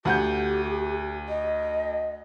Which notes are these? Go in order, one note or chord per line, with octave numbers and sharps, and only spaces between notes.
D2 G4 F#5 G6
D#5